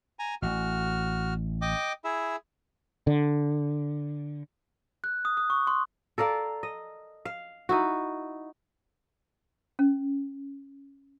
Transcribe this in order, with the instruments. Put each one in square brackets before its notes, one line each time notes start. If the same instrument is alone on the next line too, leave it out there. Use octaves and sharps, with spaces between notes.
[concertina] G#5 A#5
[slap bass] A1 [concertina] F#4 F6
[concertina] D#5 G5 D6
E4 G#4 E5
[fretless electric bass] D3
[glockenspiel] F#6
D#6
D#6
C#6
C6
[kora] A4 A#4 D5 F5
D#5
F5
D#4 E4 F#4
[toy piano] C#4